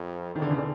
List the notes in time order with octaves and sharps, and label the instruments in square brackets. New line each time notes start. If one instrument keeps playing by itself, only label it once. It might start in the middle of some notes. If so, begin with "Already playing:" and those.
Already playing: [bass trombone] F2
[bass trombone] E2 [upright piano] D#3
[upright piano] D3
C#3
D3